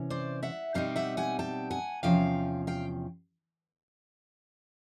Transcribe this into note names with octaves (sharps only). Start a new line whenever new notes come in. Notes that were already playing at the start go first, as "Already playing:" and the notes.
Already playing: C3 E3 C#4
C5 D5
E5 F#5
B2 G3 C4 D#4 F5 G5
E5 F#5
F#5 G#5
G5 A5
F#5 G#5
E2 C3 F3 C#4 F5 G5
F5 G5